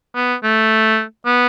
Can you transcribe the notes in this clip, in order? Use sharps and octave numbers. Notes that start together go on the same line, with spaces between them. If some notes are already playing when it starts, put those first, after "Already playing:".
B3
A3
B3